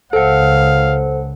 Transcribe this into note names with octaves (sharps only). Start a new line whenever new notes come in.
C#2 A4 C5 F5 F#5